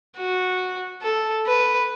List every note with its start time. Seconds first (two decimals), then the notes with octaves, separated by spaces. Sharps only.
0.17 F#4
1.03 A4
1.47 B4